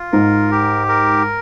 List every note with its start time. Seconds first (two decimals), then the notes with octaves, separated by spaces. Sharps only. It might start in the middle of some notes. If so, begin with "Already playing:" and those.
Already playing: F4
0.12 G#2 A#4
0.51 G4
0.89 A#4